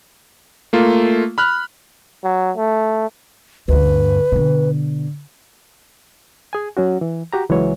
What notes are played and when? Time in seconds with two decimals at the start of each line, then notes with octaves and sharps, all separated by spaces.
0.73 A3 A#3 F4
1.38 B5 F6 F#6
2.24 F#3
2.57 A3
3.68 D2 G2 B4
4.32 B2 D3
6.53 G#4 G#5
6.77 F#3 C#4 F#4
7.01 E3
7.33 F#4 G4 A#5
7.49 C#2 E3 F#3 G#3 C#5